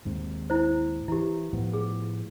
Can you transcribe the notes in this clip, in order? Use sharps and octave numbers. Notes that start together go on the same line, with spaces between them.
D#2 G#2 C4
E4 C5
E3 E4 G4
A2 F3 B3
G#4